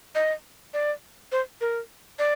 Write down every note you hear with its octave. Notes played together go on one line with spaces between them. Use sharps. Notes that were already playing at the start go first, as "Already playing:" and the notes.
D#5
D5
C5
A#4
D5